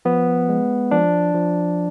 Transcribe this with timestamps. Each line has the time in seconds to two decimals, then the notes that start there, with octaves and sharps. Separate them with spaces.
0.05 F3 B3
0.49 G#3
0.91 F3 D4
1.34 F3